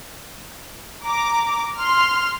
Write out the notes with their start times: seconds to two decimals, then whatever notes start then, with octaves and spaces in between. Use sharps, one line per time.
1.05 A#5 D6
1.77 C6 F6